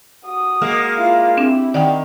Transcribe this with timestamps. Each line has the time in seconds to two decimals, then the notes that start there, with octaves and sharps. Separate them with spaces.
0.25 F#4 D#6
0.61 G#3 A#3
0.97 E4 F4
1.37 C4 D4 E4 G4
1.74 D#3 D5 F#5 G5